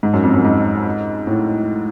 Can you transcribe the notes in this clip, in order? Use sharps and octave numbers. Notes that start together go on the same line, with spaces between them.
G#2
F#2
F2
F#2
G#2
A2